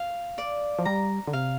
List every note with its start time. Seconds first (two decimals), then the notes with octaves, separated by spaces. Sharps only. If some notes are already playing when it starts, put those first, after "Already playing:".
Already playing: F5
0.38 D5
0.79 F3
0.85 G3 A#5
1.27 D3
1.33 C3 F5